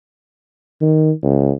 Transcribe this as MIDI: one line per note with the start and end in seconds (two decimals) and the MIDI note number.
0.81 1.12 51
1.23 1.51 37